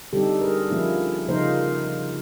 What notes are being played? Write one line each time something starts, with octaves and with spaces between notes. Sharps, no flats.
D3 G3 C4 D#4 G4 A4
G#4 A#4
D3 F3 A#3 C#4 E4
C#3 F3 A#3 D#4 A#4 C5